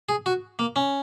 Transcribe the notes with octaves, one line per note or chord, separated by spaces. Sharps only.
G#4
F#4
A#3
C#4